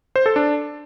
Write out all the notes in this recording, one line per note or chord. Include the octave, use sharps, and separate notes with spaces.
C5
A4
D4